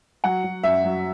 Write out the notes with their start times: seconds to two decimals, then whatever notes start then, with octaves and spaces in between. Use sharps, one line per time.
0.24 F#3 F#5
0.44 F#3
0.63 F#2 E5
0.84 F#3